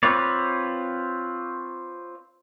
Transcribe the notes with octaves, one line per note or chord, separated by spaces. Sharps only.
C4 F4 B4 C#5 D5